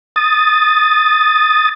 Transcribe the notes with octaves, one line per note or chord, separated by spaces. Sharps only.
D#6 A6